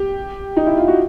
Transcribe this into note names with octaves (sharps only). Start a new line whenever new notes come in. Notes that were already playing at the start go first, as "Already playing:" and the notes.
Already playing: G4
D#4
E4
F4
F#4